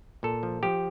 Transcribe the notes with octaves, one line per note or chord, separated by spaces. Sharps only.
A#2 A4
F3
F3 G4